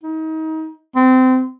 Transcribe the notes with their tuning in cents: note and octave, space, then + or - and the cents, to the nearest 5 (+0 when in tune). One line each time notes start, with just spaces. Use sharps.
D#4 +30
C4 -25